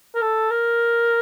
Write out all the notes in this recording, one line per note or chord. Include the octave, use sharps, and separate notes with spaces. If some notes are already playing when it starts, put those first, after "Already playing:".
A#4
A4
A#4